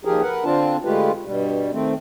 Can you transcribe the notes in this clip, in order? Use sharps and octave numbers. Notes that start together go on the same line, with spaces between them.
D#2 D#3 F3 G4 G#4 A#4
A#4 B4 F#5
D3 C4 D4 F4 A5
D3 G#3 A3 F4 G4 B4
G2 B2 G3
D#3 A3 C4